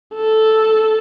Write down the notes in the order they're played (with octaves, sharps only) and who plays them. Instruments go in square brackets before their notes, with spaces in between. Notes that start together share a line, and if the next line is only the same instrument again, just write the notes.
[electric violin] A4